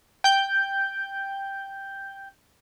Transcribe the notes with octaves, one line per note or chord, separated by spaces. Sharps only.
G5 G6